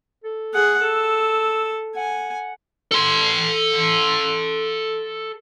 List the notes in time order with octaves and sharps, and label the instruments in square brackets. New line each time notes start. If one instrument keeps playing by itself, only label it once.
[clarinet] A4
[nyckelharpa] G#4 F#5
[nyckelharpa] A4 [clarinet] E6
[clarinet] F#5 [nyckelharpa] G#5
[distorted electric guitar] A4 C6